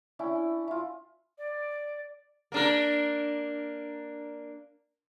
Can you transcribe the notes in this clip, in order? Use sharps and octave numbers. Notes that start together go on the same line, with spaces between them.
C#4 D4 E4 G5
E4 F4
D5
A#3 D4 A#4